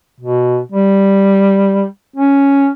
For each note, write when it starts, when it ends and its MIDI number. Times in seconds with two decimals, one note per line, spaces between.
0.20 0.59 47
0.72 1.85 55
2.16 2.68 61